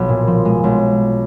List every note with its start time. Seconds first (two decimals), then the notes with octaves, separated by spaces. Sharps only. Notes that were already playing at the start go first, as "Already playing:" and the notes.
Already playing: B1 F3
0.09 A#2
0.27 F3
0.45 G#3
0.64 B1